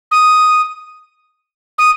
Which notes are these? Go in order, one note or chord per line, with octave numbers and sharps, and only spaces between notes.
D#6
D#6